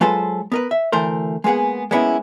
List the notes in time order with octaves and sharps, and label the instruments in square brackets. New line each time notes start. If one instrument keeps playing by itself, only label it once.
[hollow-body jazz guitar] F#3 G#3 F4 A4 B4 C5
B3 A#4 B4
E5
D2 E3 A3 A#4 C5
G#3 A#3 B3 G#4 F#5
G#3 A#3 B3 C#4 E4